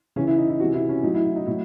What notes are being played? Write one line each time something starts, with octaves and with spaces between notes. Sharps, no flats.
C#3 E3 C#4
E4
D#4
E4
C3 E3 F#4
E4
C#4
A2 F#3 D#4
E4
E4
D#4
A2 F#3 E4